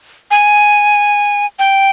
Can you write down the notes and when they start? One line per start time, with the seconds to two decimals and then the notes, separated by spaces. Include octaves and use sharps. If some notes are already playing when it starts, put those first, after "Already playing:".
0.31 G#5
1.59 G5